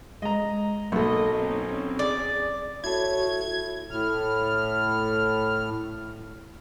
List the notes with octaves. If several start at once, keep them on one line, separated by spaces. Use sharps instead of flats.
G#3 D#5 A#5
B1 A#3 F#4 A4 D#5
C4 C#4 D#4
G#4 D5
E4 F#4 A4 C#5 G#6
A2 F6